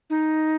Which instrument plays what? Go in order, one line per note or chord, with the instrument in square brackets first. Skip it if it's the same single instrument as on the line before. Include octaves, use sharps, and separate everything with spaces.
[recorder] D#4